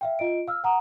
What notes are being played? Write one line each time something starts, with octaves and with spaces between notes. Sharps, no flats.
E5 F5 G5
F4 D#5 D7
F5 E6 F6
F#5 A#5 D#6